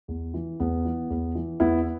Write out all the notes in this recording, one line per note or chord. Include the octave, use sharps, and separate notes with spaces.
E2
E3
E2 B3
E3
E2
E3
E2 B3 E4